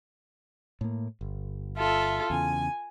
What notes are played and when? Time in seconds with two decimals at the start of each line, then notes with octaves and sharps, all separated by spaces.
0.81 A2 A#3
1.21 G1
1.76 F4 A4 E5
2.30 E2 C#3 G#5